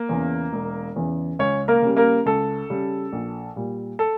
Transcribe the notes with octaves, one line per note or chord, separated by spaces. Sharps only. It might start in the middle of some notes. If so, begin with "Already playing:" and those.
Already playing: A#3
E2 C#3 E3
E1
E2 C#3 E3
C#2 C#4 C#5
A#3 A#4
C#3 G3
A#3 A#4
C#2 A4
C#3 G3
A#1
A#2 G3
A4